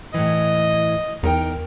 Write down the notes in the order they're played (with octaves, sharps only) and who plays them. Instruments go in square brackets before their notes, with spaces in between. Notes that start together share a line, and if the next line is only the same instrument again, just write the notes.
[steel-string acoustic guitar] A2 E3 [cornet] D#5
[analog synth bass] E2 [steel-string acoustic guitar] D#4 A#4 G5